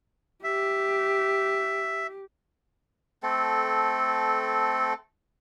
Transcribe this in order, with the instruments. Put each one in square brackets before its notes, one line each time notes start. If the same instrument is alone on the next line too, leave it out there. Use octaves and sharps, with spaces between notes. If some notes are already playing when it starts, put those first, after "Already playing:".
[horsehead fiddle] G4 [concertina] E5
[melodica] A3 C4 A4